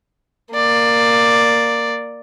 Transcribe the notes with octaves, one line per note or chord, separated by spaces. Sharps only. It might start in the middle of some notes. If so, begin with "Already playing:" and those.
A#3 D5